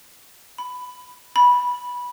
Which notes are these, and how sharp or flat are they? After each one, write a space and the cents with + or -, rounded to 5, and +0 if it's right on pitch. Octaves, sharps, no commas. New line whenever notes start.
B5 +10
B5 -15